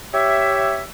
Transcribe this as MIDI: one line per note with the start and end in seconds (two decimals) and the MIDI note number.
0.14 0.83 67
0.14 0.83 73
0.14 0.83 76